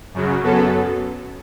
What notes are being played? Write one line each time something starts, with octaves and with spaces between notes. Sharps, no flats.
F#2 C#3 F#3
F#2 F#3 B3 A4